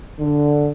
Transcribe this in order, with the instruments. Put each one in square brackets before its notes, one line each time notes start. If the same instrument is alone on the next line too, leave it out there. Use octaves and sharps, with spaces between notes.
[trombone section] D3